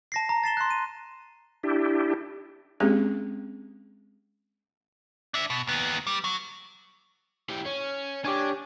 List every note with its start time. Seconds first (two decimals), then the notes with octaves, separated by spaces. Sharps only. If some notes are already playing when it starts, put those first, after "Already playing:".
0.12 A5 A#6 C7
0.29 A#5
0.44 A6 C7 E7 G7
0.57 C6 F#6
0.71 D#7
1.63 D4 E4 G4
2.80 G#3 A#3 C4 C#4 G4 G#4
5.34 D4 E5
5.50 B2
5.67 D#2 B3
6.07 G3
6.24 F#3
7.50 E3 G4
7.66 C#4
8.25 D4 G4 C#5 G#5